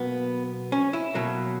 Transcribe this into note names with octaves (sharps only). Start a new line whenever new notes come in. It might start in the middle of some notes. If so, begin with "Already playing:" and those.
Already playing: B2 F#3 A#3 B3
C#4
E4
B2 F#3 A#3